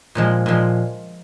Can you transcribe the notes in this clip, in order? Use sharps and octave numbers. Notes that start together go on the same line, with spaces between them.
A#2 F3 G#3
A#2 F3 G#3